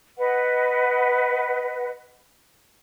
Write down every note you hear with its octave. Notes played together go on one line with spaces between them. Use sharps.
B4 D#5 F#5